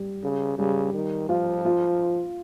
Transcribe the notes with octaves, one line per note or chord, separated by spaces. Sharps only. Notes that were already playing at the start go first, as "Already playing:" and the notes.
Already playing: G3
C#3
C#3 G3
D#3
F3 F4
F4